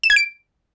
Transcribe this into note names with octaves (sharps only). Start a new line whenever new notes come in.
E7
G#6
D7